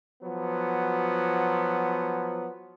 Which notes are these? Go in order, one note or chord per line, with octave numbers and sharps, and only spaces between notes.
F3 F#3 B3